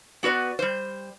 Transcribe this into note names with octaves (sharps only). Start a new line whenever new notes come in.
B3 F#4 B4 D5
G3 C5